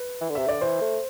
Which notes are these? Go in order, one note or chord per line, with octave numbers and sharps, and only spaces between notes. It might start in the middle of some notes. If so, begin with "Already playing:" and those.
Already playing: B4
E3
D3
C3 E5
D3 D5
E3 C5
A3